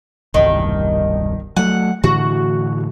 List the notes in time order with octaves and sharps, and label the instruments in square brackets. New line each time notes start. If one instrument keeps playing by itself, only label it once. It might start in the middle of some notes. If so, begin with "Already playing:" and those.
[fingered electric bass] E1 C2 G2 [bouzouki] D#3
[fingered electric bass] F#3 A3 [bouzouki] F#5
[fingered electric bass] A2 D3 E3 [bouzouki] F#4